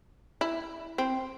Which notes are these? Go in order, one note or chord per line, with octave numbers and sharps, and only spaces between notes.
E4
C4